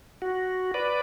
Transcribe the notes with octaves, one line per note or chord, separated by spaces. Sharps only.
F#4
B4 D5